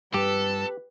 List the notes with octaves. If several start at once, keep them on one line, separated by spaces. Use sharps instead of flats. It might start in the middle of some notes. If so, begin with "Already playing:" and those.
G2 G4 A4 B4